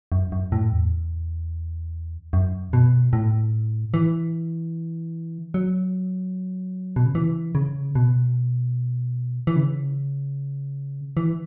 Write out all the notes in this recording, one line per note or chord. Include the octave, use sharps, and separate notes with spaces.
F#2
F#2
A2
E2
F#2
B2
A2
E3
F#3
B2
C#3
E3
C#3
B2
E3
C#3
E3